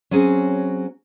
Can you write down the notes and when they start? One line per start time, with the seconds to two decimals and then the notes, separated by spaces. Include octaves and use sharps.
0.11 F#3 C4 C#4 G#4